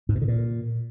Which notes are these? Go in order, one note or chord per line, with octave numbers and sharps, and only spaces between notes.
G#2
B2
D3
A#2